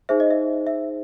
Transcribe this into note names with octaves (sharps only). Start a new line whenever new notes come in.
D#4 G#4 C5 E5
D#5
E5
E5